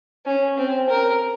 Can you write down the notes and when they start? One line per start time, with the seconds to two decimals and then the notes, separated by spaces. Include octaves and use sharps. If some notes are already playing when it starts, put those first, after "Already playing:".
0.26 C#4
0.58 C4
0.89 A#4